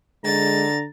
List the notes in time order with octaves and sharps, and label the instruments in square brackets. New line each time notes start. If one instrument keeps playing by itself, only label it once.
[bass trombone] D3 [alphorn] G#3 [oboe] A#5 [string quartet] A6